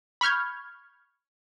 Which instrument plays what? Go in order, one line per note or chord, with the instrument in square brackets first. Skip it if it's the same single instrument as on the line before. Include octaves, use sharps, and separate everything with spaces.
[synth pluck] B5 C#6 F6 G6 G#6